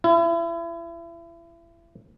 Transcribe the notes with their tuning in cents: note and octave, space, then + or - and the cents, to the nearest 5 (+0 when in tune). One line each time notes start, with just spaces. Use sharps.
E4 +35